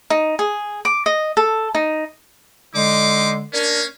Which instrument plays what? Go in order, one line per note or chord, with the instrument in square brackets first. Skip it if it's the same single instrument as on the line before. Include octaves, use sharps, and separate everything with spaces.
[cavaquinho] D#4
G#4
D6
D#5
A4
D#4
[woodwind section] D3 G#3 [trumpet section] D#4 C6 D6
[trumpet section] A#3 C#4 [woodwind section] D4 A#4